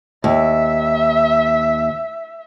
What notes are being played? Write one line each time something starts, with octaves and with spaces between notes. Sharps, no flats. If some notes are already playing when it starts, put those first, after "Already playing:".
D#2 E5